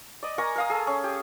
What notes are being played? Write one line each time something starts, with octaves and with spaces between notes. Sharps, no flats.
D5 D#5
A#4 G#5 A#5 C#6
A#4 F5 D#6
G#4 A4
C#4
G4